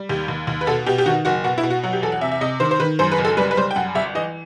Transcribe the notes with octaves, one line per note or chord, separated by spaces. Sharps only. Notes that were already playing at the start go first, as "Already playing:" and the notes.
Already playing: G3
D#2 G4
D#2
D#2
B4
B2 A4
B2 G4
G4
D#3 F#4
F#1 F#4
B2 F#4
E4
B2
F#4
F#3 F#4
G4
E2 A4
F#5
C3 E5
E5
C3 D#5
D#3 C5
C5
D#3 B4
F#2 C5
B4
F#1
A4
G3 B4
B4
G3 C5
G5
F#2 F#5
G1 E5
E3 D#5